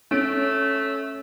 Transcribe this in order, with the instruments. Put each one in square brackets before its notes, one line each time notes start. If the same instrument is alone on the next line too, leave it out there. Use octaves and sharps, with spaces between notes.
[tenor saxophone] A3 [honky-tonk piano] C#4 D7